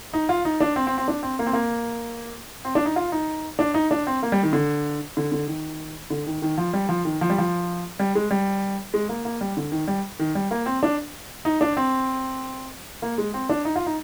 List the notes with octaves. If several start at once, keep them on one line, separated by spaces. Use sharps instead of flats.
D#4
F4
D#4
D4
C4
C4
C4
D4
C4
A#3
C4
A#3
C4
D4
D#4
F4
D#4
D4
D#4
D4
C4
A#3
G3
D#3
D3
D3
D3
D#3
D3
D#3
D#3
F3
G3
F3
D#3
F3
G3
F3
G3
G#3
G3
G#3
A#3
A#3
G3
D3
D#3
G3
D#3
G3
A#3
C4
D4
D#4
D4
C4
A#3
G#3
C4
D4
D#4
F4
D#4